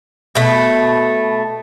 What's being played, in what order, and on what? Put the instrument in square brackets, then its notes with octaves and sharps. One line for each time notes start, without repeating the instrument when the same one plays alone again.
[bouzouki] B2 A3